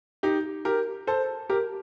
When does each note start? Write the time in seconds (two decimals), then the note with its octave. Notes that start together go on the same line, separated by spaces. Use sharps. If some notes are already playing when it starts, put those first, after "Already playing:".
0.23 D#4 G4
0.65 G4 A#4
1.07 A4 C5
1.50 G4 A#4